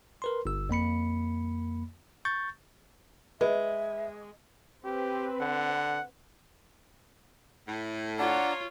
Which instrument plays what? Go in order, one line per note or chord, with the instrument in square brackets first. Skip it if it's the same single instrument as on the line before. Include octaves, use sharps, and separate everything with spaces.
[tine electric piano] A#4 B4 C6
G1 E6
F2 A#3 B5 C#7
C#6 G6 A6
[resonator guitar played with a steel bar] G#3 [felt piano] B4 [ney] E5
[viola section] C4 B4 [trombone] G4
[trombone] D3 [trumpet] F#5
[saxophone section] A2
[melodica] D4 A5 A#5 [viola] F4 C#5 [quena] F#5